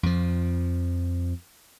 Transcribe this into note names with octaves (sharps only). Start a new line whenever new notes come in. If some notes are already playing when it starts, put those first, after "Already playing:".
F2 F3